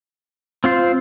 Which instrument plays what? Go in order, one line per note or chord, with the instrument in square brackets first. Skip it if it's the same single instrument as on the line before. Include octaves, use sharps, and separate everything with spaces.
[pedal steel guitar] C4 F4 C5